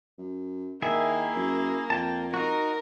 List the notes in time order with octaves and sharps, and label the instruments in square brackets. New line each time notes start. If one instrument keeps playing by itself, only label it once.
[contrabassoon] F#2
[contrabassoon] D#3 [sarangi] A#3 [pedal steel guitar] E4 G#4 E5
[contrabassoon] F#2
[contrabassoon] F2 [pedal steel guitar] G5 A5
[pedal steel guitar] D#4 F#4 [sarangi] A#4